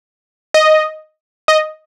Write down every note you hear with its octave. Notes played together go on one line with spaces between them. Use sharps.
D#5
D#5